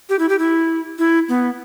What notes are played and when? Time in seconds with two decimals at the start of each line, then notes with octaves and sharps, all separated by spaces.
0.09 G4
0.19 E4
0.29 G4
0.39 E4
0.99 E4
1.29 B3